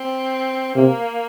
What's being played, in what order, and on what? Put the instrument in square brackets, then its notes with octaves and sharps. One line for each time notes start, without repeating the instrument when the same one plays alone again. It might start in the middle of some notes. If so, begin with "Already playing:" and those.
Already playing: [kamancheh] C4
[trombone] C3 [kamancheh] A#3